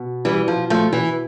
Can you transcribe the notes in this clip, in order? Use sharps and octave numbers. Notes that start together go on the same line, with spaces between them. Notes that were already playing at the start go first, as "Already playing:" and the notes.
Already playing: B2
E3 G3
F3
F3 A3
E3